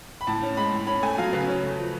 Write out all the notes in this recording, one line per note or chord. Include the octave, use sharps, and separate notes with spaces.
B5
A2 A5
C#4
G#3 B5
A2
C#4 B5
A3 G#5
F#3 F5
C#3 B4
C#4
A3
F3